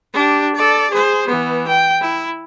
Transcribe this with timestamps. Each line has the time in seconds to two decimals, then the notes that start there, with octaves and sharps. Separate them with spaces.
0.13 D4 G4
0.55 A4 D5
0.90 G#4 C5
1.27 E3 B3
1.68 G5
2.00 E4